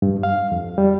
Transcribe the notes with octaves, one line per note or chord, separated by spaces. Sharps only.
G2
F5
F2
G3